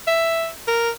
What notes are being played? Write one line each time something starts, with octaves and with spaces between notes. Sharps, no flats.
E5
A#4